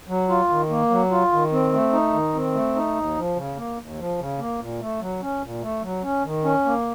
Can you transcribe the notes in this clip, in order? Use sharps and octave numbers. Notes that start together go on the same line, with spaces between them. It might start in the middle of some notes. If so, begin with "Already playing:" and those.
F#3
F4
D#3
A#3
F#3
F4
D#3
C4
A3
D#4
D#3
C4
A3
D#4
D#2
F3
C#3
A#3
D#2
F3
C#3
A#3
A#2
A3
F#3
C#4
A#2
A3
F#3
C#4
D#3
C#4
A#3